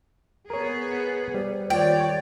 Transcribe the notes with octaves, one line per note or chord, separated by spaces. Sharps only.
B3 G#4 A#4 C#5
G3 C5
D#2 F4 C#5 D5 G5